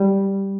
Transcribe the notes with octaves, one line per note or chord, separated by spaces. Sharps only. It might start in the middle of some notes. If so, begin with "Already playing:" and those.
Already playing: G3